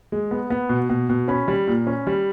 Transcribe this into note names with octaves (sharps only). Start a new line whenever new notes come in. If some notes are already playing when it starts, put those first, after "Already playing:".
G#3
B3
B3
B2
B2
B2
C#4 B5
G3
A#2
C#4
G3